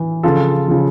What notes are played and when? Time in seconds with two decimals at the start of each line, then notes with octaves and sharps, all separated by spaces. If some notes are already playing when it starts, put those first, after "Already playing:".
Already playing: E3
0.23 C#3 F3 F4 A4
0.68 C#3 F3